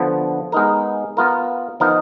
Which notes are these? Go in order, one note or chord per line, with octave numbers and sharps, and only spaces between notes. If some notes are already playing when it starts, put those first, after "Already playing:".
Already playing: D3 F3 B3
G#3 B3 D#4 A#4
B3 F4 A#4
F3 B3 D#4 A#4 D#5